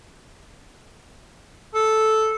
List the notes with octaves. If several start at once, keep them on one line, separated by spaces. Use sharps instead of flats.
A4